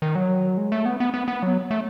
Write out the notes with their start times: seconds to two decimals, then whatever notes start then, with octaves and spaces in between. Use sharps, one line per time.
0.02 D#3
0.15 F#3
0.57 G#3
0.72 A3
0.86 B3
1.00 B3
1.14 B3
1.28 B3
1.43 F#3
1.71 A3